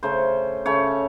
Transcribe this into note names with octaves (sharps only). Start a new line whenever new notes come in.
C#3 A3 C#4 C5
C#3 A3 C#4 C#5